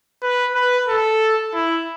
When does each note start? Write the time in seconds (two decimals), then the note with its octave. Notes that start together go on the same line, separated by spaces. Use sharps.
0.23 B4
0.54 B4
0.88 A4
1.54 E4